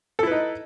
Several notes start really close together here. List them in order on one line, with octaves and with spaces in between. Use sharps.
A4 E4 B4 D#4